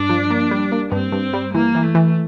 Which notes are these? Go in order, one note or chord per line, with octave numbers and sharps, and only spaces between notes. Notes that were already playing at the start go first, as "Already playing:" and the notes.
Already playing: G2 D4
F3
A#3
G3
A#3
G2 C4
G2
G3
E3 A#3
E3
A3
E3